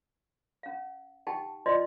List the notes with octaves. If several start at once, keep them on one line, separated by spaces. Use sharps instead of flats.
C#4 F5
D#4 G4 F#5 G5 A5
E4 F4 C5 D5 D#5 C6